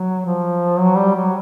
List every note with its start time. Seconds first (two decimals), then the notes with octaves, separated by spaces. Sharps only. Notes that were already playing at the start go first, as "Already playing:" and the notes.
Already playing: F#3
0.25 F3
0.79 F#3
0.97 G3
1.15 F#3